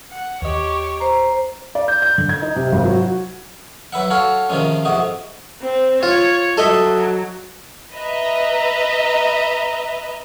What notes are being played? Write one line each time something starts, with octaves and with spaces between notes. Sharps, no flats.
F#5
D#2 G4 C#5 D#5
C5 A#5
D5
G6
G6
D3
G#6
D#4
C3
G#1
F#3
F#4
F#3 B4 E5 F#5
F#4 A4 C#5 F5 F#5
C3 D#3 F3 G#3 C#4
F2 G#2 C3 F#4 D#5
C4
F4 C#5
F#3 A4 D#5 E5
B4 D#5 E5 A#5